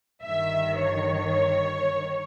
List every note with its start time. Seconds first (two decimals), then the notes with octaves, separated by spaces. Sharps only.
0.23 G1 G2 D#3 E5
0.78 C#5